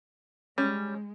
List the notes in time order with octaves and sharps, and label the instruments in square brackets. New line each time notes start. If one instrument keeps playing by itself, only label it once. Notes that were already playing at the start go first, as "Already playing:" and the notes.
[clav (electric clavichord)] G3 [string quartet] G#3 [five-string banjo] C#4